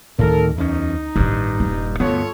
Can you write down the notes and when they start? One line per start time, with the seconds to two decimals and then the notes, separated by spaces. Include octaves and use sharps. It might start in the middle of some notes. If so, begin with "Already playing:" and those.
0.19 D2 A2 D#3 A4 A#4
0.57 E2 C#4 D#4
1.16 A1 G2 D#3
1.60 D#1
2.00 D2 G2 F3 B3 F4 A4 C#5